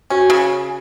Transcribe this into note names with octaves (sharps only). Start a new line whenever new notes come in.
C#4 F#4
C#3